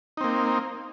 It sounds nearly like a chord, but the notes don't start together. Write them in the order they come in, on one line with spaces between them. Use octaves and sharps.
D#4 C4 A#3